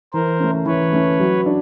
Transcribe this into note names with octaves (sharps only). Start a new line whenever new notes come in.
E3 A#4 C5
A3 C#4
E3 B4 C#5
A3 C#4
F#3
D4